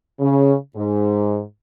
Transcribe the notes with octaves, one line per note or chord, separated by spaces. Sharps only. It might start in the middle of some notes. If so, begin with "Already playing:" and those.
C#3
G#2